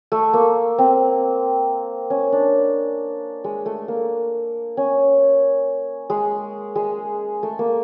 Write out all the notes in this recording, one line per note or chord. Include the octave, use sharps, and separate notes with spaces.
A3
A#3
C4
C#4
D4
G#3
A3
A#3
C#4
G#3
G#3
A3
A#3